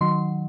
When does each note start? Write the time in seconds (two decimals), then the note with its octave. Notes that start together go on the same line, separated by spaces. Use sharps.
0.01 D#3 F#3 C6